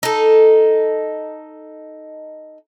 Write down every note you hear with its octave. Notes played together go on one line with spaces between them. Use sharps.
D#4 A4